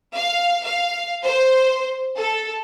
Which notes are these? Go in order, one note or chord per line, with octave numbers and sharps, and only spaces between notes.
F5
F5
C5
A4